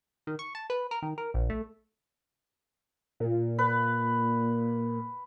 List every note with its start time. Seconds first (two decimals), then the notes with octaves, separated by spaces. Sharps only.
0.27 D#3
0.39 C#6
0.55 A5
0.70 B4
0.91 A#4
1.02 D#3
1.18 A#4
1.34 A#1
1.50 A3
3.20 A#2
3.59 B4